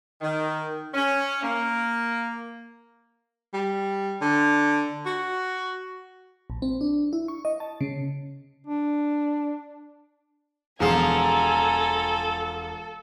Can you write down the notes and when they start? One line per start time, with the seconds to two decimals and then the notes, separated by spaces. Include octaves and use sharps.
0.21 D#3
0.94 C#4
1.42 A#3
3.54 G3
4.21 D3
5.06 F#4
6.50 A#1
6.62 C4
6.81 D4
7.13 E4
7.28 C#6
7.45 D#5
7.60 A5
7.81 C#3
8.67 D4
10.80 E1 F3 F4 G#4 A4 G#5 A#5 C7